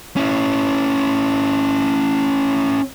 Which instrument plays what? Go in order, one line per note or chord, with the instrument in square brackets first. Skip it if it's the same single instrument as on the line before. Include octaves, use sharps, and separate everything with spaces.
[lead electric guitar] C#4 E4